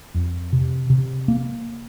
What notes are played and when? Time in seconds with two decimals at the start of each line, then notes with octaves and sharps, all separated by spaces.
0.14 F2
0.53 C3
0.90 C3
1.28 A#3